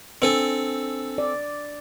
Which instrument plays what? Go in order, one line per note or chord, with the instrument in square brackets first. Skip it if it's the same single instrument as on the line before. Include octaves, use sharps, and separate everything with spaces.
[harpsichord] C4 A4 G#5 [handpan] D4 D#5
[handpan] D5